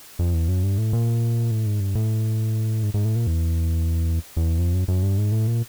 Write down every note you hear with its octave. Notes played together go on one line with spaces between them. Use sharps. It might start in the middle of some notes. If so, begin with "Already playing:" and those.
F2
E2
F#2
G2
A2
A#2
A2
G#2
G2
A2
G#2
G#2
A2
A#2
E2
E2
F2
F#2
F#2
G2
G#2
A2
A#2